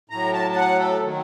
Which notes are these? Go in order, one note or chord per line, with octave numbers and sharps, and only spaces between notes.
A2 F#3 A#5
A5
A5
F#5
A4
D#3 F#3